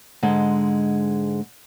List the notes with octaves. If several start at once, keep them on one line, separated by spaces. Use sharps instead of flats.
G#2 D3 G#3